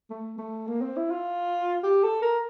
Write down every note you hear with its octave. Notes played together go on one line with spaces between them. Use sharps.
A3
A3
A#3
C4
E4
F4
G4
A4
A#4